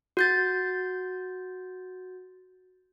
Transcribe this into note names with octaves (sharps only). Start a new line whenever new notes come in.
F#4 G6 A6